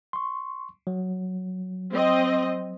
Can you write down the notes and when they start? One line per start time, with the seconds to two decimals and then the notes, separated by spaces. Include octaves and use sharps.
0.13 C6 C#6
0.87 F#3
1.92 C4 D#5